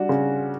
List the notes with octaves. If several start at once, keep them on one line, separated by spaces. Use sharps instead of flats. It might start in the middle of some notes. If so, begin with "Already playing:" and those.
Already playing: G3 D4 F#4
C#3